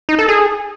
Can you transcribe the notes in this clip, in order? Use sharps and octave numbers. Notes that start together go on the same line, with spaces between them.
D#4
A4
G#4